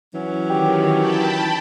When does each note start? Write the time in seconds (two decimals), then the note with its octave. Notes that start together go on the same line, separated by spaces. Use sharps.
0.14 E3 F#3 C#4
0.50 D#3 G4
0.97 G5 A5 B5